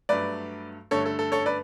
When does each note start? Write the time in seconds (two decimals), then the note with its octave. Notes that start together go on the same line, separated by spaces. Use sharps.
0.09 G2 F#3 A3 B4 D5
0.91 G2 D3 A3 A4 C#5
1.06 A4
1.19 A4
1.32 A4 C#5
1.46 B4 D5